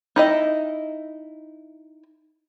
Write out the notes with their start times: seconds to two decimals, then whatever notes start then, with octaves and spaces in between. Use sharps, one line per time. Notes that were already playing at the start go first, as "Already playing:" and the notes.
0.16 D#4 E4 D#5